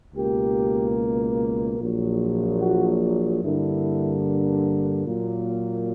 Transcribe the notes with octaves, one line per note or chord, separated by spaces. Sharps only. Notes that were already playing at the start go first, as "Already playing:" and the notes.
C#2 B2 A#3 G4
A#1 A#2 F#3
F#4
G2 D3 A#3 E4
A#2 F#3 A#3